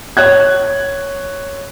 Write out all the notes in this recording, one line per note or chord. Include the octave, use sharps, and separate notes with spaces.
C#5 F#6 G#6